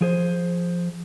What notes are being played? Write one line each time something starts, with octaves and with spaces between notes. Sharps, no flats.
F3 G#4 C5